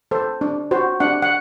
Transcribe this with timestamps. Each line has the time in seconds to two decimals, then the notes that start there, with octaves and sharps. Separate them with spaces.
0.11 A4 C5
0.41 D4
0.71 F#4 C5
1.00 D4 F#5
1.22 F#5